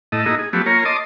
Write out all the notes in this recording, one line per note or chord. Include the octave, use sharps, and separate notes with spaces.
A2 A3 E4 D#5
A#3 D#4 E4 F#4 G#4 D#5
G#4
F3 F#3 A3 B3 G4
A#3 F4 A#4 C#5
D#5 A5 C6 D6 D#6